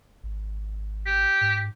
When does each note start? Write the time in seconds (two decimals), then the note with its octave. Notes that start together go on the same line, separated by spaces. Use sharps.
0.23 G#1
1.06 G4
1.41 G#2